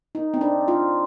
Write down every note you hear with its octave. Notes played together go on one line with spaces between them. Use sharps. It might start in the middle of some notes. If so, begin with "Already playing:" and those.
D#4
C4
D4
F4